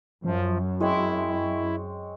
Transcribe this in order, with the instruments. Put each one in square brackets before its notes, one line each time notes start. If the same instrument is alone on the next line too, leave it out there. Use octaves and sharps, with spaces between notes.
[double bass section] F#2 [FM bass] F3
[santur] G#3 C4 C#5 [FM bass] E4